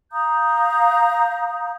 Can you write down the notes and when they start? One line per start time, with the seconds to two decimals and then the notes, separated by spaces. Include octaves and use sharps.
0.11 F5 A#5 D#6 G6